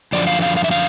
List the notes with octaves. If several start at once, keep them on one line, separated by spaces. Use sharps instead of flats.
F#2 D3 F3 D5
F5
F5
F5
E5
F5